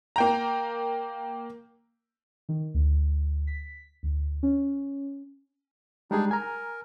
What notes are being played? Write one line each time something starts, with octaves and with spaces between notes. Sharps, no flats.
A#3 G5 A#5
D#3
D2
B6
D2
C#4
G3 G#3 D4 D#4 G#4
A#4 G#5 A#5